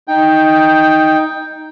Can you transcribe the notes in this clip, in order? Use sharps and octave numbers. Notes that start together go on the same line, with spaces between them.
D#4 G5